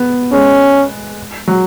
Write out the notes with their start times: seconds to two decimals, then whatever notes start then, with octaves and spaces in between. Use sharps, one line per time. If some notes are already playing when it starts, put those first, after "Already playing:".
Already playing: B3
0.32 G#3 C#4
1.47 F#3